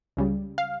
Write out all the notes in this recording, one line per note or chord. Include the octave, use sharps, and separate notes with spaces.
C#2 C#3 G3
F5